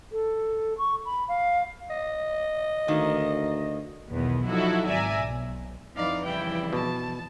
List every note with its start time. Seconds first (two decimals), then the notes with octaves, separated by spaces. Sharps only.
0.12 A4
0.78 C#6
1.05 B5
1.28 F5
1.90 D#5
2.88 D2 D#3 A#3
4.11 B1 E2 D#3 B3
4.46 F3 F#3 D#4 E4 F#4 A4
4.87 G#1 D5 E5 G#5 A#5
5.22 B1
5.96 F2 E3 D#4 D5 F5
6.25 C#3 G3 E4 G5
6.73 B2 A5